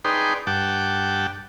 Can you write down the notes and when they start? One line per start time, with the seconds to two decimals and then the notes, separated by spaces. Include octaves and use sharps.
0.05 D#4 G#4 B4 D5 G5 C6
0.47 G2 F#5 G5 A5 D6